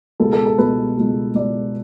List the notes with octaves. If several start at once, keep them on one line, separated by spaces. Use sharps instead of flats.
C#2 B2 G3 A4
A4
A4
C#2 B2 G3 B4
C#2 B2 G3
C#2 B2 G3 D5